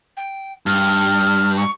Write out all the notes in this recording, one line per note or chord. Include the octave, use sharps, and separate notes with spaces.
G5
G2 F6
C#6